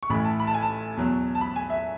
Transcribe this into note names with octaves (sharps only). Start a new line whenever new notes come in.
C#6
A1 A2 E3 A3 B5
A5
B5
A5
G#5
A5
E2 B2 F#3
A5
B5
G#5
E5